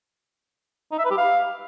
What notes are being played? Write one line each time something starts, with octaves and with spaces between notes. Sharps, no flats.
D#4
E5
B4
G4
F5